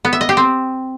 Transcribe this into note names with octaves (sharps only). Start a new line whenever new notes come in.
B3
E5
D#5
G4
C4